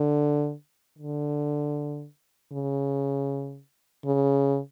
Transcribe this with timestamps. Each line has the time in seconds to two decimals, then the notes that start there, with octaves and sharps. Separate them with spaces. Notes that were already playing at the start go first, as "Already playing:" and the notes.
Already playing: D3
0.99 D3
2.52 C#3
4.05 C#3